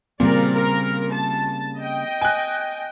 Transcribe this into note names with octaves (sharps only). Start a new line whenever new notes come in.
A#2 C#3 G3 A#3 C4 A#4 D5
A#4
A5
D#5 G5
G#5 F#6